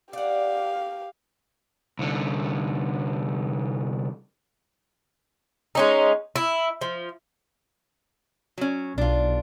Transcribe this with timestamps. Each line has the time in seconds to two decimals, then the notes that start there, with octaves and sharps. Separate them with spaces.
0.13 G4 D5 F5 F#5
1.99 C2 D3
5.75 G#3 C#4 D#4
6.36 E4
6.81 F3
8.58 F#3 C#4
8.98 B1 D4 F4